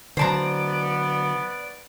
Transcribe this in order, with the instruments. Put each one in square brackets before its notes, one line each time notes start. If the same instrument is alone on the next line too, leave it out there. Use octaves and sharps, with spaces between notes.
[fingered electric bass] D3 F#3 [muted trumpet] B3 [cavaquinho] C5 A5 A#5 [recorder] D5